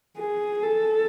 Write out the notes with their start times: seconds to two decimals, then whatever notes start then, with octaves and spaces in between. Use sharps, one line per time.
0.18 G#4
0.63 A4